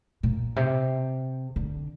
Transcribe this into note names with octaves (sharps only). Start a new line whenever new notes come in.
A#2
C3
D3